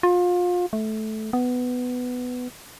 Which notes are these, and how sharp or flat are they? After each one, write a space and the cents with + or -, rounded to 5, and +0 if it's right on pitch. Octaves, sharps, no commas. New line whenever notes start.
F4 +30
A3 -15
B3 +10